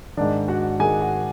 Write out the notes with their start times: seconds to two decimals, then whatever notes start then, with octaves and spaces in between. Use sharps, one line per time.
0.17 G#2 D#3 D4 D5
0.48 F#4 F#5
0.80 D#3 G#4 G#5
0.83 G#2
1.01 F#4 F#5